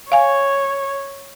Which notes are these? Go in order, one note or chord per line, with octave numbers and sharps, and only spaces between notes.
C#5 F5 G#5